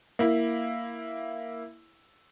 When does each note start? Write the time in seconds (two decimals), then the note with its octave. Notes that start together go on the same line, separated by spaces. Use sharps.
0.19 A#3 E4